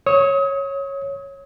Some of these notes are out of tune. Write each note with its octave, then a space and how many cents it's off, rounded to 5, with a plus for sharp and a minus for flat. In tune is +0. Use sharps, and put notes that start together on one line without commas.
C#5 -10 D#6 +35